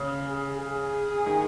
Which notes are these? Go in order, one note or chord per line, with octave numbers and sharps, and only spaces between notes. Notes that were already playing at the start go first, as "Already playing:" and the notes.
Already playing: C#3
G#4
G#4
D#3